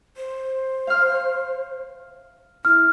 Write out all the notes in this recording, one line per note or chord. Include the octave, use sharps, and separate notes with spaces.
C5
F5 F6
E4 F6